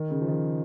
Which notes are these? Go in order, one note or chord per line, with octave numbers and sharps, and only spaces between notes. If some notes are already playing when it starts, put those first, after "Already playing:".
Already playing: D#3
C#3
F3
D#3